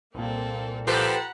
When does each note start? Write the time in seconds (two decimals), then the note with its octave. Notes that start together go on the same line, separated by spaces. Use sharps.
0.15 C2 A#2 A#3 C4 A4
0.87 F3 G4 A4 B4 F#5 A#5 B5